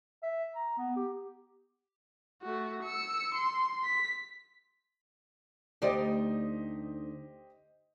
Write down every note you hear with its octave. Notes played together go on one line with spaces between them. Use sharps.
E5
A#5
B3
G4
A3 F#4
E6 C#7
C6
B6
D2 D#4 G4 C5 D5 D#5